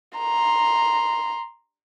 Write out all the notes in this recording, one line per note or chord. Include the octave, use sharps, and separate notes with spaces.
A#5 C6